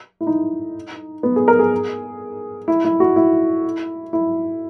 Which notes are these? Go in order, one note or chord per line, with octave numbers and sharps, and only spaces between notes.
E4
D#4
B3
G#4
A#4
G#4
E4
E4
F#4
E4
E4